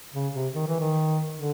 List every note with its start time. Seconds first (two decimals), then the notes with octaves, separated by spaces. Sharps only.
0.13 C#3
0.34 C3
0.54 D#3
0.67 E3
0.80 D#3
1.36 D3